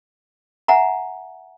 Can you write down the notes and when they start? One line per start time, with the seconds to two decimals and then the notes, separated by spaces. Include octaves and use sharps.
0.68 E5 F#5 G#5 A#5